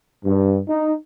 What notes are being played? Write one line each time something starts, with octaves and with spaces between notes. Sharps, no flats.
G2
D#4